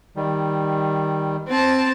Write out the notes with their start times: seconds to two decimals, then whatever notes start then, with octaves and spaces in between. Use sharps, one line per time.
0.16 D#3 G3
1.49 C4 A5